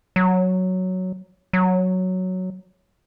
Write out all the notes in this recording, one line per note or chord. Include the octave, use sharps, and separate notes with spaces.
F#3
F#3